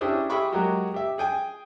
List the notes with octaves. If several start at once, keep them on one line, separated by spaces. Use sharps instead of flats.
C#4 D4 E4 G4 G#4 C5
G4 G#4 E5 B5 C#6 D6
F#3 G#3 A#3 F#4 G4
G4 E5
G#4 G5 G#5